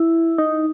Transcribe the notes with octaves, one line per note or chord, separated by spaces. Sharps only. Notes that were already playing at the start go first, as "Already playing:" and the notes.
Already playing: E4
D#4